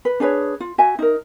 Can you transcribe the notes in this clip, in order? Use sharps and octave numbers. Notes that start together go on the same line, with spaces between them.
B4
D4 G#4 B4 C#5
F4
F#4 E5 G#5
D#4 A#4